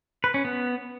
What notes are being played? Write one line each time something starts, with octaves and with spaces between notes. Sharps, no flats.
B4
C#4
B3